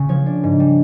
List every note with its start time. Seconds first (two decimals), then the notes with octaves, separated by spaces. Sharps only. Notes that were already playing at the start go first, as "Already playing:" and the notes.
Already playing: C#3 A3 C#4
0.09 F3 C#5
0.26 D4
0.43 G#2
0.60 G3